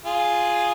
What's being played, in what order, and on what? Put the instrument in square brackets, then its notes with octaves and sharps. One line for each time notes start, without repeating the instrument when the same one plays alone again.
[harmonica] F4 G#4